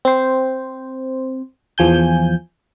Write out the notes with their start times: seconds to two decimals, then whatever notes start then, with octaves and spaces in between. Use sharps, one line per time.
0.05 C4 C5
1.78 E2 F3 G#5 G6